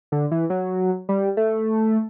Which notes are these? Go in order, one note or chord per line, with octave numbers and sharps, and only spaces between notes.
D3
E3
F#3
G3
A3